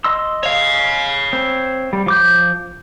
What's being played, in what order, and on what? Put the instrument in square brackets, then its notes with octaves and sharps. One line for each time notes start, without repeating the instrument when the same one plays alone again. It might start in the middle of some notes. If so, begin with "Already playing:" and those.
[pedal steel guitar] D#5 C6 E6
[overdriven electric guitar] C#5 F5
[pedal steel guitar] C4
G3
F3 D6 G6